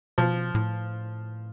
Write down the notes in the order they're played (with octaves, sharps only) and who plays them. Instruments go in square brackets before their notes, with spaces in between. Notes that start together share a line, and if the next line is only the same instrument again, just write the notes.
[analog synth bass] B2 [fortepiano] F3
[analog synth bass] A2